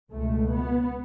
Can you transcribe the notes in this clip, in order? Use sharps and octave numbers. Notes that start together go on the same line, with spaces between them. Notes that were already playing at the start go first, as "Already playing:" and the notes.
C#2 B2 A3
B3